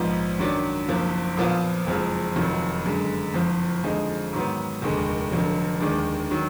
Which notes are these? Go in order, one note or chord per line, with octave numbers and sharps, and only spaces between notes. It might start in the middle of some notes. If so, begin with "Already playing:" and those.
Already playing: A#1 G#2 F3 B3 D#4
F#2 D#3 F#3 D4
F#1 F#2 F3 A#3
A#2 F3 B3 F4
F#1 F2 F3 G#3
F1 F2 D#3 F#3
F#2 D3 G#3
F#1 F2 F3
F2 D3 F3 G#3 D#4
G#2 D#3 F#3 B3
F1 D#2 D3 G#3
F1 F2 D3 F#3
D#2 D#3 G#3 D4
D#3 F#3